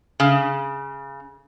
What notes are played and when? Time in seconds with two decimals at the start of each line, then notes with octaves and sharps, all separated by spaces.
0.20 C#3